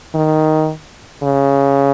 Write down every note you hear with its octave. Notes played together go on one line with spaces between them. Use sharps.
D#3
C#3